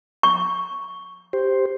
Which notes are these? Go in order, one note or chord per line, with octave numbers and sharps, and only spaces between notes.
C#6
G4 C5